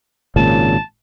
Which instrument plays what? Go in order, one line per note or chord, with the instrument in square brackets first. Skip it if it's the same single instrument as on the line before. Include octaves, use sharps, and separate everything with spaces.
[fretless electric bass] G#1 A#2 C#3 [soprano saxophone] A5